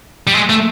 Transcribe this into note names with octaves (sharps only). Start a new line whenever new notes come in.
G3
G#3
A3